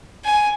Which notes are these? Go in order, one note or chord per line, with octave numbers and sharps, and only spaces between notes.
G#5